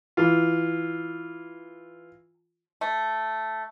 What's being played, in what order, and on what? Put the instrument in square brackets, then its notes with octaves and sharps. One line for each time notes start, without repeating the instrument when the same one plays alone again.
[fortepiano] E3 F4
[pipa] A3